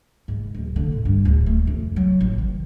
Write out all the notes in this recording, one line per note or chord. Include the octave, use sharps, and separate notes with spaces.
G#2
D1
D3
A2
G2
D1
A3
F2
F#3
A1
D#3